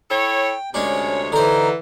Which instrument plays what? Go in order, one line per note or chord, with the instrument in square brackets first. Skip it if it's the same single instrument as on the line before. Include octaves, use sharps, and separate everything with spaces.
[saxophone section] E4 A4 C#5 [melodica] G5
[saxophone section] D2 C3 C#5 [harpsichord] G#3 D4 [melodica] C#4
[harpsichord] D3 C5 [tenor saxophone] E3 [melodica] D#4